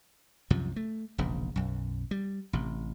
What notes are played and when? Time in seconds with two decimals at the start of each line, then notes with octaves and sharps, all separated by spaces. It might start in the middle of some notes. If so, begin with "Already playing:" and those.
0.50 C2 F#2 C3 F3
0.76 A3
1.18 E1 A#1 C#3
1.56 B1 F#2
2.11 G3
2.53 A1 C3